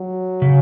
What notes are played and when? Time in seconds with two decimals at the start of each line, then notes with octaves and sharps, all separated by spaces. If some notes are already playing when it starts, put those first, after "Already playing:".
Already playing: F#3
0.42 C#3